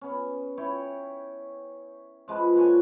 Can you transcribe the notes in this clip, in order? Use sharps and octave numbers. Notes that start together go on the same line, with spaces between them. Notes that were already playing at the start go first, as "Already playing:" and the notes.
B3 C#4
E4 C#5 G5
F3 G#3 F#4 B4
A#2 D3 C#5 G#5